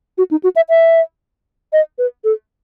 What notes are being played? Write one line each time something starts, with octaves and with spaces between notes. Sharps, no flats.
F#4
D#4
F#4
E5
E5
D#5
B4
A4